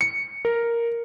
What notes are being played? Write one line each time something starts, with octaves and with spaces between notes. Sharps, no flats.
C#7
A#4